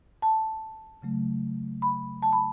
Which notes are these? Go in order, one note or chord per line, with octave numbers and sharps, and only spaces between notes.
A5
C#3 F#3 A3
B5
A5
B5